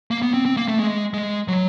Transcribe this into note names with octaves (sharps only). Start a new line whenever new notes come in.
A#3
B3
C4
C4
A#3
A3
G#3
G#3
F#3